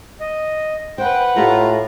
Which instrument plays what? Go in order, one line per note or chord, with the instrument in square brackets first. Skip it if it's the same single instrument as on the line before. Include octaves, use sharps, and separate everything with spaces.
[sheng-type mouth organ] D#5
[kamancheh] B4 F#5 [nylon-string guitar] C5 [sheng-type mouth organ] G5
[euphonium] A2 [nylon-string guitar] A3 G4 [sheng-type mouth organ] F4 A#5